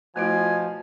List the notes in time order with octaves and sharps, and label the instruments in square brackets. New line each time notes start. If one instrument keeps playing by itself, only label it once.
[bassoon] B2 [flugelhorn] F3 [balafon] A3 E4 F4 [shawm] G#5